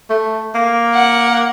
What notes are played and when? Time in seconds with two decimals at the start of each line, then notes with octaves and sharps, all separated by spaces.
0.10 A3
0.55 A#3
0.94 F#5